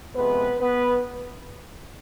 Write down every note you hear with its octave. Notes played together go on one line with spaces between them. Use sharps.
F2 C3 G#3 B3 B4
B3 B4